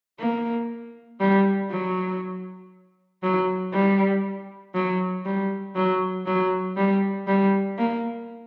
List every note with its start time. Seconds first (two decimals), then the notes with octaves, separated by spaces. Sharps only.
0.20 A#3
1.20 G3
1.71 F#3
3.23 F#3
3.73 G3
4.75 F#3
5.25 G3
5.76 F#3
6.26 F#3
6.77 G3
7.27 G3
7.78 A#3